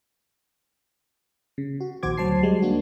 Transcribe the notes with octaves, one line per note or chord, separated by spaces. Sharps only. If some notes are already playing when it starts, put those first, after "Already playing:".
C#3
F#4
A#1 D#2 F#4 C5 D6 G#6
D2 F#3 C5 A5 C7
G3 G#3
A#3 D4 F#4